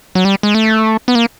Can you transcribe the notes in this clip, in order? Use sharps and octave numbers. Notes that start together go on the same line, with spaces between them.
F#3
G3
G#3
A3
B3
A#3